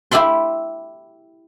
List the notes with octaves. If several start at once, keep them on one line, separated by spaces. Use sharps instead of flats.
E4 G4 E5 B5 C6